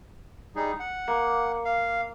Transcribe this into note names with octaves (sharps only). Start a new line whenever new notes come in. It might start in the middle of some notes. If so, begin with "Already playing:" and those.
G3 D#4 G#4
F#5
A#3
F5